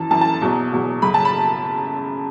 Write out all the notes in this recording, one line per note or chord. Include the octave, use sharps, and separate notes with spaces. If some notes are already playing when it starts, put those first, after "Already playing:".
Already playing: F#2 E3 A5
F#2 E3 A5
A5
E2 B2 F#3
E2 B2 F#3
F#2 C#3 F#3 B5
A5
B5